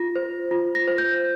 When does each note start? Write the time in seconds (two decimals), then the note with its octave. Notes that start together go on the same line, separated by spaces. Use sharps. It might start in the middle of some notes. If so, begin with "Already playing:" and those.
Already playing: F4 A#6
0.16 C5
0.51 F4
0.75 A#6
0.88 C5
0.98 G6